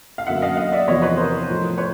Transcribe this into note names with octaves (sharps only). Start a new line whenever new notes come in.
F5
F#2 D3 F#3 A#3 E5 F#5
D#5 F5
D#5 F5
D5 E5
E2 C3 F3 C#5 D#5
B4 C#5
A#4 C5
A2 F3 A3
B4 C#5